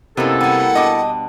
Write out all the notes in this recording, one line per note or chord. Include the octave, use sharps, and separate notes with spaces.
F#2 C3 A#3 B3 E4 A4 D#5
G3 F#5 G#5
B2 D4 D#5 D6